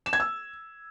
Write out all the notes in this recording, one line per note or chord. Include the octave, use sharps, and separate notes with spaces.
E7
G#6
E6